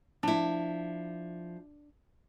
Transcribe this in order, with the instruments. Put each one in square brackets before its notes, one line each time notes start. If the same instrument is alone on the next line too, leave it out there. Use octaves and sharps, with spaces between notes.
[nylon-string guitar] F3 E4 [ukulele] D4